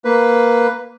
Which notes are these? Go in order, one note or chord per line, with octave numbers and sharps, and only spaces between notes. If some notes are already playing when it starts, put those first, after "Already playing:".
A#3 B4